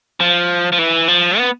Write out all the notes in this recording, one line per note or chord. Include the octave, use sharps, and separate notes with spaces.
F3
F3
E3
F3
B3